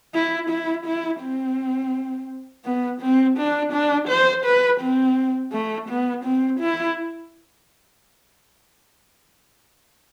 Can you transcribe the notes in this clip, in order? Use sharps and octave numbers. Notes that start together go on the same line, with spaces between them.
E4
E4
E4
C4
B3
C4
D4
D4
C5
B4
C4
A3
B3
C4
E4